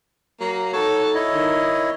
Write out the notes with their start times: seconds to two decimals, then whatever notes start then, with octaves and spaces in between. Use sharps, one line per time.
0.41 F#3 A#3 A#5
0.73 D#4 F#4 A4 C#5
1.15 E4 C#5 D#5
1.33 D#3